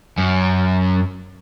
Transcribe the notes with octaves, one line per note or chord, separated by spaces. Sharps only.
F#2